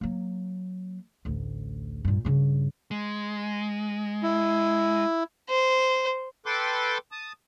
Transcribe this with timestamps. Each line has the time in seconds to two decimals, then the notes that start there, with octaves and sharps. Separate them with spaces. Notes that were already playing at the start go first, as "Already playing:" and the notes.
0.01 F#3 A#3
1.25 A1 D2
2.05 G2 A#2
2.25 G2 C#3
2.91 G#3
4.23 E4
5.49 C5
6.46 A4 B4 G5 C6 D6
7.12 A5 D#6